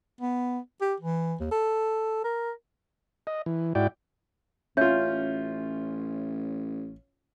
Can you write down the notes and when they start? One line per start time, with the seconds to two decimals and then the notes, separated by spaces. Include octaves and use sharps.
0.21 B3
0.81 G4
1.00 E3
1.40 D#2
1.51 A4
2.24 A#4
3.27 D#5
3.46 E3
3.75 G#2 E4 F#4 D5 G5
4.77 A1 C#4 F4 E5 G6